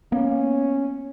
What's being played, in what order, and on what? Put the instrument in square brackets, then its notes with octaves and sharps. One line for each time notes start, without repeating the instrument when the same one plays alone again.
[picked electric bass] A#3 B3 [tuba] C#4